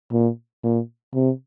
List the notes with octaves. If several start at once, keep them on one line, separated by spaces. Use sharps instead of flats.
A#2
A#2
C3